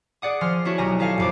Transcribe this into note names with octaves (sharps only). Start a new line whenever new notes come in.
G#4 D5 F#5 D#6
F3 G#5 C6 F6
C#4 D4 E4 F#4 C#5
B1 G4 G#5 A#5 F6
D#4 E4 A4 C#5 F5 G#5
E1 F2 D6